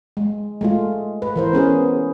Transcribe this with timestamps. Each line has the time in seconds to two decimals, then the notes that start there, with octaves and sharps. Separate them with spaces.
0.17 G#3
0.61 G#3 A3 F4
1.22 B4
1.36 E3 A#4 C5
1.53 B3 C#4 G#4 B4